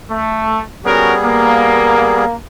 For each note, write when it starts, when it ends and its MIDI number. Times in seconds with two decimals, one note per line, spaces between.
0.11 0.60 57
0.85 2.25 55
0.85 2.25 59
0.85 1.15 61
0.85 1.15 66
0.85 2.25 68
0.85 1.15 70
1.22 2.36 58